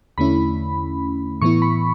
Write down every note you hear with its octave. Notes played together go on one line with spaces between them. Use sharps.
E2 D3 A3 C#4 E4 B5
A2 E3 B3 E4 C#6
B5